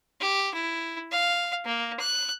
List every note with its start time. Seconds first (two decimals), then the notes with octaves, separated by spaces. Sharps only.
0.21 G4
0.54 E4
1.12 F5
1.65 A#3
2.00 F#6